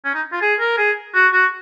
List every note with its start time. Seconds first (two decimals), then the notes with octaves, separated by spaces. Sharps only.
0.05 C#4
0.15 D#4
0.33 F4
0.42 G#4
0.60 A#4
0.78 G#4
1.15 F#4
1.33 F#4